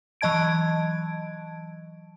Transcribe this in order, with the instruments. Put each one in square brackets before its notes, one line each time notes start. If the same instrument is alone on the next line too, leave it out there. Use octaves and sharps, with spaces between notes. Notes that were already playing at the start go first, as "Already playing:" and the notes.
[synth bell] E3 F#3 D#5 A5 G#6 D7